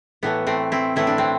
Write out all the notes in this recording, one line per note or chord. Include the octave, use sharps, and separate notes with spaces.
A2 E3 A3 B3
A3 C4
C4 E4
A2 E3 A3 E4
D4
C4